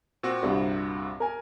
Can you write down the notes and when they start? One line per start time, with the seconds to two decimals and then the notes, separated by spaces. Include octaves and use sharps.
0.23 A#2 C4 F#4
0.43 C2 G2
1.20 A#4 G#5